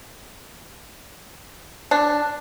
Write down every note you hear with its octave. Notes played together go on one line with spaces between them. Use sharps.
D4